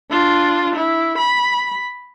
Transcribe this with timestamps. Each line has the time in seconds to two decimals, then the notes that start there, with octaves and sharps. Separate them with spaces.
0.11 D4 F4
0.75 E4
1.18 B5